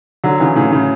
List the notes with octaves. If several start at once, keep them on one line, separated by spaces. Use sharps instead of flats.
D3 F#3
C#3 E3
A2 C#3
A2 C#3